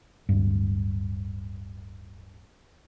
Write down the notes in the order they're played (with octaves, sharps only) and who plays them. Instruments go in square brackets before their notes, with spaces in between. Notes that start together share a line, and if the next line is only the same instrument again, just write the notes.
[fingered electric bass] D1 G2